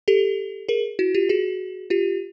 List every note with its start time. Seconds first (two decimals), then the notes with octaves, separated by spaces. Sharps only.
0.08 G4 A4
0.69 G#4 A#4
0.99 E4 F#4
1.15 F4 G4
1.29 F#4 G#4
1.90 F4 G4